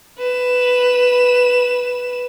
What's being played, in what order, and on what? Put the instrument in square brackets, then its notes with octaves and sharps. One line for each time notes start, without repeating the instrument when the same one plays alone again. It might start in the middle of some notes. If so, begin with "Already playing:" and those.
[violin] B4 E7